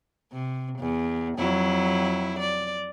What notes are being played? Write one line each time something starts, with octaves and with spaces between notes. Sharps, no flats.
C3
E2
F2 F#3 E4
D5